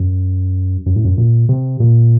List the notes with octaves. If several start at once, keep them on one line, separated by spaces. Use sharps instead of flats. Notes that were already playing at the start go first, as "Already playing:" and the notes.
Already playing: F#2
F#2
A2
F#2
A#2
C3
A#2